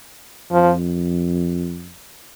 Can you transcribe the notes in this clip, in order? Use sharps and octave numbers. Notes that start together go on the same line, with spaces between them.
F2 F3